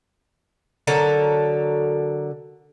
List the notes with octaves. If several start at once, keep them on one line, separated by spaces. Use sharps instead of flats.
D3 F#3 A4 A#4